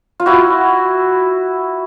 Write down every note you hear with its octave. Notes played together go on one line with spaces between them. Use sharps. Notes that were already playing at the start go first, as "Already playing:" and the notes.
F4
E4 F#4